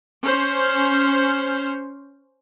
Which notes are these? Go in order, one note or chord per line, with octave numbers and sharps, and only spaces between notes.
C#4 C5